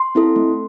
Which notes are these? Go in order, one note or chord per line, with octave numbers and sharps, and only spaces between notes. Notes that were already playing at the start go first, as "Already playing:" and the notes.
Already playing: C6
C4 E4 A4
A3